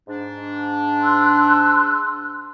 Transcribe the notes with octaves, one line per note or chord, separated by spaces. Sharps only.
G#2 D4
C6 E6 F#6